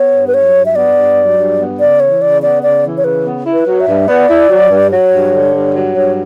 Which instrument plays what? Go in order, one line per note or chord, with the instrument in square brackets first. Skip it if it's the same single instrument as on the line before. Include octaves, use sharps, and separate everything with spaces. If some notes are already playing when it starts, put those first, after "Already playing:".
Already playing: [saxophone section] B3 [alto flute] C#5
[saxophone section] G2
[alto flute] B4
[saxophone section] F#3 [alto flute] C#5
[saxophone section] G2
[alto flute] E5
[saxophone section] B3 [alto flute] D5
[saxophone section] G2
F#3
G2
B3
[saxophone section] C#3 [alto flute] D5
[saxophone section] E3 [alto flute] C#5
[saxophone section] C#3 [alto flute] D5
[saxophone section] B3 [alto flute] D5
[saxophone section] C#3 [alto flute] D5
[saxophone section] E3
[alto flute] C#5
[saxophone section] C#3 [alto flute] B4
[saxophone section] B3
E4
[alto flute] B4
[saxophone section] F#3
[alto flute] E5
[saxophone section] G2
[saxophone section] B3 [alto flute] D5
[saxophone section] E4
F#3
G2
[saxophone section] F#3 [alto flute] C#5
[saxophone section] G2
D3
G2
F#3
[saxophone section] G2 [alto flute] C#5